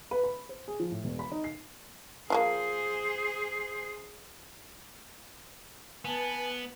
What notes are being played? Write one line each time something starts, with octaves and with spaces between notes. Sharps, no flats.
B4
B5
C5
G#4
F3
A2
E1
B5
D#4
C7
F3 A3 A#3 G#4 C5
B3 B4 G#5 A5